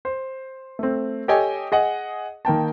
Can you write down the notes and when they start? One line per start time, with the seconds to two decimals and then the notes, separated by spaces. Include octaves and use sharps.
0.05 C5
0.79 A3 C4
1.28 G4 A4 C#5 D#5 G5 G#5
1.72 G#4 D#5 F#5
2.45 D#3 A#3 G5 A5